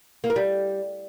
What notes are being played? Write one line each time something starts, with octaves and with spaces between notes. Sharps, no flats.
A#3
A#4
G3